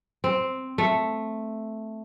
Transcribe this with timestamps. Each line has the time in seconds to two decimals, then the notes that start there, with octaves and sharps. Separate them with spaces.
0.24 C4
0.78 A3